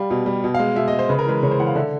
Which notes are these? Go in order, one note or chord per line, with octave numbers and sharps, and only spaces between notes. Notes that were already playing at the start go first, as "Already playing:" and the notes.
Already playing: G3 F5
B2
G3
B2
F5
G#3
B2 E5
D#5
G#3
C5
C#3 B4
A#4
E3 G#3 B4
C#3 C#5
C5
E3 G#3 F#5
F5
D3 E5